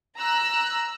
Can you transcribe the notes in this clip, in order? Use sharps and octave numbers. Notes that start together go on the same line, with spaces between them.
A#5 E6 F#6